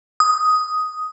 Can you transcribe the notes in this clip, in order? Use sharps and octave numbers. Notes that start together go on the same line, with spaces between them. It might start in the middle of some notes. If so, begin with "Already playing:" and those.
D#6